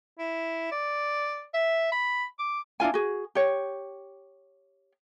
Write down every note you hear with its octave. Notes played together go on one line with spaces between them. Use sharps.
E4
D5
E5
B5
D6
D4 E4 F4 G#5
F#4 G#4
G4 C#5